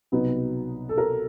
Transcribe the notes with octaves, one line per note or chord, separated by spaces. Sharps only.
C2 B2 F#3 B3 D#4 B4
A4
A#4